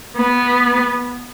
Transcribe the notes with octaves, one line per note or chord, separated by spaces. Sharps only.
B3